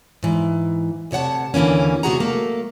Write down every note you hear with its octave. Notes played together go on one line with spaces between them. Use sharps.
G#2 E3
D2 C3 C#5 F#5 A5
D#2 D3 E3 A#3 C#4
C3 A3 F#4 G#4 F#5 A#5
F#3 A3 A#3